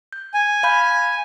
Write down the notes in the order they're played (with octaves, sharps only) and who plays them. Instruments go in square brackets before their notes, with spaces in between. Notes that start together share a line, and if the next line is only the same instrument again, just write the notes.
[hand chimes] G6
[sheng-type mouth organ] G#5
[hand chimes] F5 B5 G6